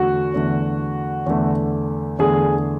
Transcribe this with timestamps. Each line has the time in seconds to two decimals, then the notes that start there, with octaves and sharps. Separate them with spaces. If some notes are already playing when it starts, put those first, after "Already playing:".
Already playing: E2 D3 A3 F#4
0.34 E2 D3 A3
1.26 E2 D3 A3
2.19 E2 D3 A3 G#4